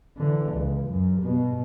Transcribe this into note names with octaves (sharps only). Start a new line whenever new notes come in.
D3 E3
C#2
F#2
G2 B2